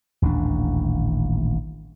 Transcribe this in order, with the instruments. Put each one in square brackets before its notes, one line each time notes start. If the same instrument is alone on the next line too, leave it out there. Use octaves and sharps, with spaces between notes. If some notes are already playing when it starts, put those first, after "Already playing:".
[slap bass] D#1 A1 D#2 D4